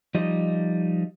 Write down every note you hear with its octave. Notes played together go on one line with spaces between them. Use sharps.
F3 G3 D#4 D#5